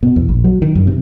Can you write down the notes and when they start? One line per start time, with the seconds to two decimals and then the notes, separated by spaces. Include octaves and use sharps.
0.03 B2
0.16 E2
0.29 A#1
0.44 F#3
0.62 D#3
0.75 F#2
0.87 C3